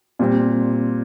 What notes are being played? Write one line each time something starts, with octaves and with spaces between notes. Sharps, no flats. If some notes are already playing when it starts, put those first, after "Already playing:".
A#2 G3 C4